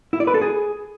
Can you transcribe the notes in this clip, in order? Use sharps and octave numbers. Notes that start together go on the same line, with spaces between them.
E4
D5
B4
A4
G#4